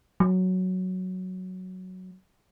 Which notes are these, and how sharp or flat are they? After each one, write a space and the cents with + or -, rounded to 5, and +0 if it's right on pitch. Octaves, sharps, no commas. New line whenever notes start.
F#3 +0